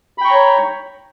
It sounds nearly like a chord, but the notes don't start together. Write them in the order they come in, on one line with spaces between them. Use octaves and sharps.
B5 G5 C#6 A#5 C#5